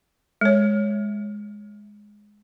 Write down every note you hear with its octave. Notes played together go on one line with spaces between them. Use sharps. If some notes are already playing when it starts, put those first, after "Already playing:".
G#3 C#5